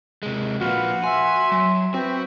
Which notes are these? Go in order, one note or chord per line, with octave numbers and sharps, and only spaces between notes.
C3 G#3
A#2 F3 F#4 B4 F5
E5 G#5 C6
F#3
C4 F#4 B4 E5 G5